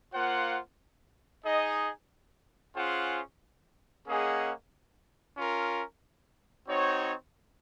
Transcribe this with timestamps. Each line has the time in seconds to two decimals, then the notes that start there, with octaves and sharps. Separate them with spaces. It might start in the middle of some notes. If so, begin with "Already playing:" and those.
0.14 A#3 F4 C5 F#5
1.45 D#4 G#4 D#5
2.75 C#4 F4 G#4 C5 F#5
4.06 A#3 C#4 G#4 D#5 F#5
5.36 C#4 F4 A#4
6.67 C4 D#4 F#4 C#5